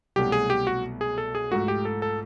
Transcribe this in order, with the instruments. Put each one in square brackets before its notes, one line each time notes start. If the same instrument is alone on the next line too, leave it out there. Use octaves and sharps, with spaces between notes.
[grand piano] C2 B2 F#3 A3 [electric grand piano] G4
[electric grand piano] G#4
G4
F#4
G#4
A4
G#4
[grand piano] G#2 F3 A3 [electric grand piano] F#4
[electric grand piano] G4
A4
A4